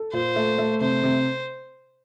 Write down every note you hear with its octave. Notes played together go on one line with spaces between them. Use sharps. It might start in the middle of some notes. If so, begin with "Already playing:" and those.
Already playing: A4
A#2 C5
A3
A3
C3 C5
C3